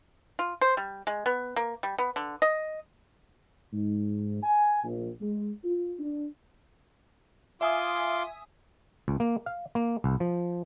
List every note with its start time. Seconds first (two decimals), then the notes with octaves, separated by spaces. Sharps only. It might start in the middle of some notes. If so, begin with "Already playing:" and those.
0.39 F4
0.61 C5
0.77 G3
1.07 G#3
1.26 B3
1.56 A#3
1.83 G3
1.99 B3
2.16 D3
2.42 D#5
3.72 G#2
4.42 G#5
4.84 A#1
5.21 G#3
5.64 F4
5.99 D4
7.61 F4 E5 G#5 C6 D6 D#6
9.08 C#2
9.20 A#3
9.46 F5
9.75 A#3
10.04 C2
10.20 F3